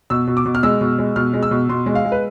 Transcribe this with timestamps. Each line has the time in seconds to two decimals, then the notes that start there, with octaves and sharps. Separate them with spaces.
0.10 B2 E6
0.27 B2
0.37 D6
0.46 B2
0.55 F6
0.63 G#3 E6
0.81 B2
0.98 G#3
1.16 B2 F6
1.33 G#3
1.43 E6
1.51 B2
1.69 B2 C6
1.86 G#3
1.95 F5
2.04 G#3
2.12 B4